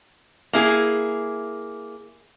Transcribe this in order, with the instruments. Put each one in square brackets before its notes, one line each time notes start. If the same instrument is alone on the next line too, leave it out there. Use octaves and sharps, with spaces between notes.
[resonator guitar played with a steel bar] A#3 E4 G#4